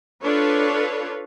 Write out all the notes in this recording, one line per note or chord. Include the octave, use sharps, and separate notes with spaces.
D4 F4 A4 B4 C#5